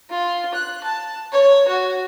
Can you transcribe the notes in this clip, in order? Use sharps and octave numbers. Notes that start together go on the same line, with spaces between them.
F4
F#6
A5
C#5
F#4